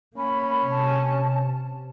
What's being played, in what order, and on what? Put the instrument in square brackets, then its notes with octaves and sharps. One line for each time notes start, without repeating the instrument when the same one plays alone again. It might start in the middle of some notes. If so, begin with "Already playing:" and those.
[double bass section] A#3 [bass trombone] C#4 [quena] B5
[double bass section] C3 [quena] A5